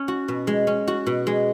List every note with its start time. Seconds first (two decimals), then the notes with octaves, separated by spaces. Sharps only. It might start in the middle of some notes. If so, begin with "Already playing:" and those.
Already playing: C#4
0.08 F#4
0.28 B2
0.47 G#3
0.67 C#4
0.88 F#4
1.07 B2
1.27 G#3